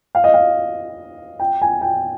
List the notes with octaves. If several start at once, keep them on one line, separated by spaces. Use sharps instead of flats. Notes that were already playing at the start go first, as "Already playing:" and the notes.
F5
D#5
F5
G5
G#5
G5